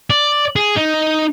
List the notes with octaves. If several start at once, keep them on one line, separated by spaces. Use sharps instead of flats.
D5
G#4
D#4